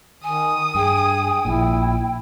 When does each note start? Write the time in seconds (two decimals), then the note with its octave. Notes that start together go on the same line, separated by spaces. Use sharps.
0.24 D#3 G#5 D#6
0.75 G2 G#4 G5
1.45 A#1 A#2 E4